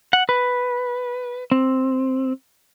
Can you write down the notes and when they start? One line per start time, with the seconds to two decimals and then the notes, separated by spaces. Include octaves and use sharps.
0.13 F#5
0.29 B4
1.51 C4